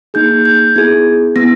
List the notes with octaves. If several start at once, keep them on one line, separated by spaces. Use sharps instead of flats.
A#3 D#4 G#4 G6
G6
B3 E4 G#4 G#6
B3 E4 A#6